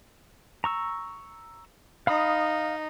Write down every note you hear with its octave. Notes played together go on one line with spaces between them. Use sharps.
A#5 C#6 E6
D#4 F5 B5 D#6